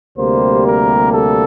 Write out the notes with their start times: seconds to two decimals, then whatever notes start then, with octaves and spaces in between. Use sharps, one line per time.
0.17 D2 C3 G3 A#3 C5
0.66 A#4
1.13 A4